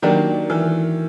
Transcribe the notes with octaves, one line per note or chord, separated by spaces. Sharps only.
D#3 F#3 A#3 D4 G4 A#4
E3